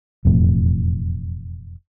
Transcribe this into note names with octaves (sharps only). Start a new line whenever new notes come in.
E1 F2 A2